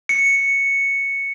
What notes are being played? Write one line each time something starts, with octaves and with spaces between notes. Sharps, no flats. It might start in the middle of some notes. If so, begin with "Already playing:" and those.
C#7